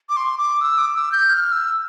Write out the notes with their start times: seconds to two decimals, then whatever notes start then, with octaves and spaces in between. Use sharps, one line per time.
0.09 D6
0.17 C6
0.38 D6
0.61 E6
0.78 D6
0.95 E6
1.12 G6
1.30 F6
1.52 E6